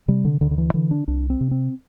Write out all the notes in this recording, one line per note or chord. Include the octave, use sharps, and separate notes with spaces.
C3 G3
D3
D2 D3
D3
E3
D3 E3
D4
C2 D4
C4
C3
C4